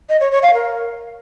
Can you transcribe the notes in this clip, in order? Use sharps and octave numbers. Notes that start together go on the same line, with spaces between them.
D#5
C#5
C#5
F5
A#4